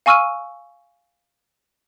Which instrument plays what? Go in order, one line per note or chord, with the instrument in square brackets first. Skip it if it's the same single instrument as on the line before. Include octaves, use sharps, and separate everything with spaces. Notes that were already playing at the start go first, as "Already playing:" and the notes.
[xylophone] F5 G#5 C#6 E6 F6 D#7